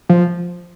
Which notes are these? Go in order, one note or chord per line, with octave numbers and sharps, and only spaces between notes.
F3